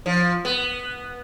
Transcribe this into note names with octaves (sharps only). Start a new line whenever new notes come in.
F3
B3